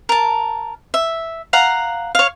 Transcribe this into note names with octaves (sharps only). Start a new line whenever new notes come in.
A#4 A5
E5
F5 F#5 A#5
C#5 F5